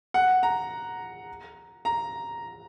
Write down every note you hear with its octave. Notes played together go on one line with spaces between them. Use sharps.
F#5
A#5
A#5